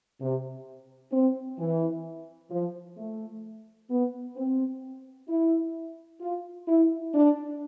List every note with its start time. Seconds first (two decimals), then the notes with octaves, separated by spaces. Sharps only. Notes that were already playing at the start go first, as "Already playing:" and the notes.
0.20 C3
1.12 C4
1.59 E3
2.51 F3
2.97 A3
3.90 B3
4.36 C4
5.28 E4
6.21 F4
6.67 E4
7.14 D4